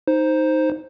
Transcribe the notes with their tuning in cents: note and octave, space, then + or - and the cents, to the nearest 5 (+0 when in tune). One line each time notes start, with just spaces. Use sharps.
D#4 +5 C5 +0